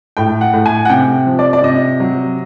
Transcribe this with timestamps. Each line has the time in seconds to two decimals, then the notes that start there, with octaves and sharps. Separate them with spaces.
0.17 A2 G5
0.41 F#5
0.54 A2
0.66 G#5
0.85 F#5
0.90 C3 G5
1.27 F3
1.39 D5
1.53 D5
1.63 C3 D#5
2.00 F#3